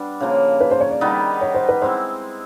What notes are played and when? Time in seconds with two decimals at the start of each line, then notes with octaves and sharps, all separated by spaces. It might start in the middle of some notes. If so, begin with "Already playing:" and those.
Already playing: G3 B3 D4
0.20 C#3 F3 A#3
0.61 B4
0.71 C5
0.80 C#5
0.91 D5
1.01 D#3 G3 B3 D#4
1.41 C#5
1.55 C5
1.69 B4
1.82 G#3 C4 E4 C5